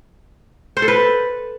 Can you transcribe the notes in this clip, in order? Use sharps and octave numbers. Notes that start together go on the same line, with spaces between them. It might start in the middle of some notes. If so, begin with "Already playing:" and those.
C5
A4
B4